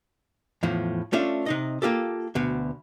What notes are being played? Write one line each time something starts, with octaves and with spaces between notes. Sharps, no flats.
E2 A2 F3
A3 C#4 D4 F4 E5
C3 D#4 D#5
A#3 F4 G4 A4
D2 B2